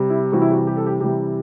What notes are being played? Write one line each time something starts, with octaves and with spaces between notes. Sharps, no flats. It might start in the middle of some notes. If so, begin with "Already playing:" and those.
Already playing: C3 G3
E4
C3 E3 G3 F#4
E4
F#4
G4
A4
G4
C3 E3 G3 G4